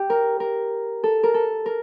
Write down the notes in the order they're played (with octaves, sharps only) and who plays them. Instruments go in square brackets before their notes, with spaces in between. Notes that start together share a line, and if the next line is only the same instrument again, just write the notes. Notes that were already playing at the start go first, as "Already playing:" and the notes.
Already playing: [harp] G4
A#4
A#4
A4
A#4
A4
A#4